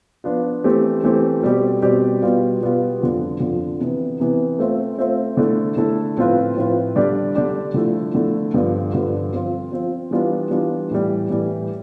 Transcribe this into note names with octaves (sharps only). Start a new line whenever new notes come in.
F3 B3 D4 F4
E3 A3 C4 G4
E3 A3 C4 G4
B2 G3 C4 G4 D5
B2 G3 C4 G4 D5
B2 G3 B3 F4
B2 G3 B3 F4
F2 D3 F3
F2 D3 F3
C3 E3 B3
C3 E3 B3
A3 C4 F4 C5 E5
A3 C4 F4 C5 E5
D3 A3 E4 A4
D3 A3 E4 A4
A2 F3 C4 F4 B4
A2 F3 C4 F4 B4
D3 G3 D4 G4 D5
D3 G3 D4 G4 D5
D3 F3 A3 E4
D3 F3 A3 E4
G2 D3 F3
G2 D3 F3
F3 C4 F4
F3 C4 F4
E3 G3 B3 D4 F4
E3 G3 B3 D4 F4
A2 E3 G3
A2 E3 G3